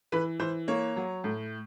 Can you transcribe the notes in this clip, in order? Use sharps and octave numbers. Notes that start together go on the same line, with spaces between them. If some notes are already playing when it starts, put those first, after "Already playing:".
E3 B4
E3 C5
A#3 C#5
F#3
A2